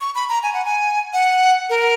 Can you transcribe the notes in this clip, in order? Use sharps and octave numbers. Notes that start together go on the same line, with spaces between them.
C#6
B5
A#5
G#5
F#5
G#5
F#5
A#4